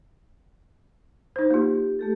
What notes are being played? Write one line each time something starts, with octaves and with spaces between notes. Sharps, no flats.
D#4 C5
A#3 F4 G4
A3 G4 A4